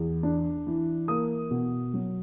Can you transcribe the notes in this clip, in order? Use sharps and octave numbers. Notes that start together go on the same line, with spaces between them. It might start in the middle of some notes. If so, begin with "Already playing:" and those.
Already playing: E2
D4
E3
A#3 D#6
B2
F#3